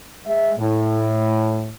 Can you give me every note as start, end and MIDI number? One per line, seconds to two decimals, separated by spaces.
0.26 0.52 56
0.26 0.52 76
0.59 1.71 45